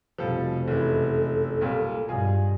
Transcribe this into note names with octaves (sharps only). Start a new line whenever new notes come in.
F1 B2 F3 G3 A4
F#1 E3 A4
B1 A#2 G3
G2 B2 F4 G#4